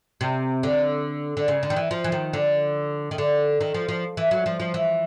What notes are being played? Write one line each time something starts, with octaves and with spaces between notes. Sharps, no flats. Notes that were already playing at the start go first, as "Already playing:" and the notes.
C3
D3
D3
C#3
D3
D#3
E3
F3
E3
D#3
D3
D#3
D3
D#3
F3
F3
E3
F#3
F3
F3
E3